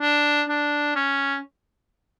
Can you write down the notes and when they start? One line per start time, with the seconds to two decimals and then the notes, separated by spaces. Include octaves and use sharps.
0.01 D4
0.49 D4
0.96 C#4